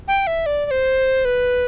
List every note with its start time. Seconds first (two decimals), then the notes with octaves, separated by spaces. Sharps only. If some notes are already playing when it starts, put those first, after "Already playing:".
0.08 G5
0.27 E5
0.46 D5
0.66 D5
0.71 C5
1.25 B4